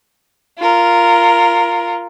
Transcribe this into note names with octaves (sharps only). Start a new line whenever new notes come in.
F4 A#4